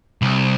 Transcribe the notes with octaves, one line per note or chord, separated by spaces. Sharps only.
C2